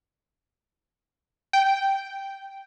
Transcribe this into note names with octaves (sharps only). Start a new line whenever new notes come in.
G5